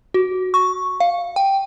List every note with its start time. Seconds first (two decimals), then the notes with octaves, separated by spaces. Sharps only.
0.14 F#4
0.54 C#6
1.00 F5
1.36 G5